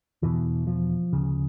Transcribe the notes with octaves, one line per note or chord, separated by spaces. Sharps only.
E2 B2 E3
F3
D2 C#3